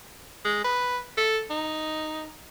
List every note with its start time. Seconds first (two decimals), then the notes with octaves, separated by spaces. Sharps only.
0.45 G#3
0.64 B4
1.18 A4
1.50 D#4